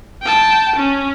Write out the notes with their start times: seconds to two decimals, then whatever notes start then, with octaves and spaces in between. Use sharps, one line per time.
0.23 G5 A5
0.76 C#4